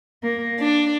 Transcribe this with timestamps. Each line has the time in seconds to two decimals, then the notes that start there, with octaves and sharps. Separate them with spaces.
0.23 A#3
0.60 D4